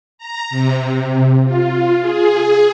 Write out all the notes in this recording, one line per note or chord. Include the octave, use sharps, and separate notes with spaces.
A#5
C3
F4
G#4